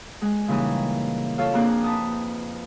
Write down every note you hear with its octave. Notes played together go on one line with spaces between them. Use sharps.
G#3 G#5 F#6
A#2 C#3 E3 G3 D#4 G#4
F4 A4 C#5 F5
F2 A#3 C4 D4 G#4 F#6
B4 A5 D#6